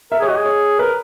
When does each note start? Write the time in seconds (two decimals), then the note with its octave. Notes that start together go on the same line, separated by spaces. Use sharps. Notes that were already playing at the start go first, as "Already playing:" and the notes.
0.12 A#4 E5
0.20 G#4 C#5
0.28 F#4 D#5
0.37 G#4
0.45 C#5
0.79 A#4 B4